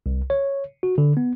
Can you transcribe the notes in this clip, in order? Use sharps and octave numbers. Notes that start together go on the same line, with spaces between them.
C2
C#5
F#4
D3
B3